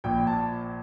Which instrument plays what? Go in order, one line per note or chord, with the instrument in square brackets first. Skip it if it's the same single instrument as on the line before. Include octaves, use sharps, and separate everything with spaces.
[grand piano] A#1 A#2 F3 G5
A5